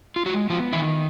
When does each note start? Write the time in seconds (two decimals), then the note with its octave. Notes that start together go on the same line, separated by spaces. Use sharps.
0.16 F4
0.26 F#3 G#3 F#4
0.50 F3 B3 F4
0.73 D#3 E3 E4